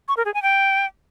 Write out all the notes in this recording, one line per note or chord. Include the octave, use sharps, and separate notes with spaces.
C#6
A#4
G#4
G#5
G5